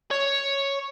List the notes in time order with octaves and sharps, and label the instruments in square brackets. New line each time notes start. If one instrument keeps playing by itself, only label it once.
[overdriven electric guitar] C#5